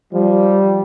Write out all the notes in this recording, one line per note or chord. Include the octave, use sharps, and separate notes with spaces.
F3 G3